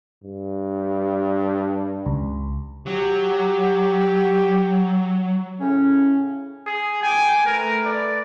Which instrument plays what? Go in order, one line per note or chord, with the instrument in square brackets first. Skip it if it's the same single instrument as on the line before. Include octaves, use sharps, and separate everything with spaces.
[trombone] G2
[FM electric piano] C#2
[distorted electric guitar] F#3 [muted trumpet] G4
[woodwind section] A2 C#3 C#4
[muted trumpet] G#4
[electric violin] G5 D6 [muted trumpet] G#5
[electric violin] A3 B4 [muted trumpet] A#4
[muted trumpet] D5